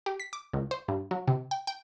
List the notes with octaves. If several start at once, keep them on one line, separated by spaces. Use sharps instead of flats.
G4
B6
D6
C#2
C5
G2
F#3
C3
G5
G5